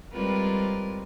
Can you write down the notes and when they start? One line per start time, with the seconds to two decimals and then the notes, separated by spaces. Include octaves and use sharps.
0.13 G3 G#3 C4 F4 A#4 B4